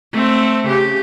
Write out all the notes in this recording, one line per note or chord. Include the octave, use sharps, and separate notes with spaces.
A3 C4
C#3 G4